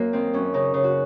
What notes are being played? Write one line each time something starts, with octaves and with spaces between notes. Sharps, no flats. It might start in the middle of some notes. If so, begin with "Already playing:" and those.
Already playing: F#2 A#3
D#3 C4
F#2 C#4
C#3 D#4
C#3
F#4